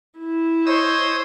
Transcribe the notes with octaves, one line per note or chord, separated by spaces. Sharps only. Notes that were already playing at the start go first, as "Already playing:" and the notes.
E4
C5 C#5 D#5 E6